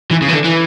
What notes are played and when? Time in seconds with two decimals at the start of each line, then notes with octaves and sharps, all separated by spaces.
0.11 E3
0.22 C#3
0.28 E3
0.33 D3
0.44 E3